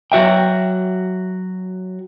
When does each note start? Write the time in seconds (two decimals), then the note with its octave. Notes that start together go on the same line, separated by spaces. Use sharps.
0.12 F#3 F#4 E5 G5